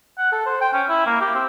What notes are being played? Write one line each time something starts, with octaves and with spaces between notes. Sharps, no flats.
F#5
A4
C5
G5
C#4
E4
A#3
G4
C4